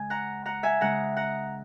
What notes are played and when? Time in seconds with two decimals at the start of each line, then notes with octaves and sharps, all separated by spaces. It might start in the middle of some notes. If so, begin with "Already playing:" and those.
Already playing: C#3 G#3 G#5
0.10 F#5 A#5
0.45 F#5 A#5
0.63 E5 G#5
0.81 C#3 G#3 C#4 F#5 A#5
1.16 F#5 A#5